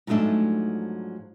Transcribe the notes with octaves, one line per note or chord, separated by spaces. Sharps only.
G#2 F3 F#3 A3 D4 A4